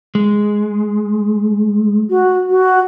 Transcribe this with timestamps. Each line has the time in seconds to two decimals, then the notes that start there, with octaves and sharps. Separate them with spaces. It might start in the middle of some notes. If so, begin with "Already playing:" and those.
0.15 G#3
2.09 F#4
2.49 F#4